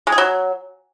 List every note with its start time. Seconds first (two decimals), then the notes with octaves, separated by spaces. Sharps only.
0.07 G#3
0.12 G#4
0.18 F#3